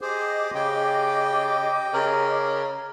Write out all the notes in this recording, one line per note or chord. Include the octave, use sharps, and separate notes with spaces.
G4 G#4 C5 D#5 D6
C#3 G5
C#3 A#4